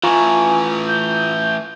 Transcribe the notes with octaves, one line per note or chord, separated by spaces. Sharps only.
E3 A3 F4 G#5 A#5 C#6
G6